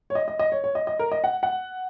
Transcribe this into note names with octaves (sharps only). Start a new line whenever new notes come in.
C#5
D#5
D#5
D#5
C#5
C#5
D#5
D#5
A#4
D#5
F#5
F#5